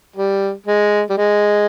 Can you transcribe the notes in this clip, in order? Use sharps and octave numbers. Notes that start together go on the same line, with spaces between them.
G3
G#3
G3
G#3